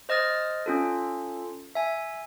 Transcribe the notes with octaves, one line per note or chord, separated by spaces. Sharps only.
C5 D#5 D#6 F6 A6
C#4 F4 A4
E5 G#5